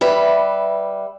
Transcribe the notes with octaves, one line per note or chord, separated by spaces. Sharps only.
G3 B4 E5